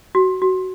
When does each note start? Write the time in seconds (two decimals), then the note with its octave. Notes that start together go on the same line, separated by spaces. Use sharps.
0.15 F#4
0.42 F#4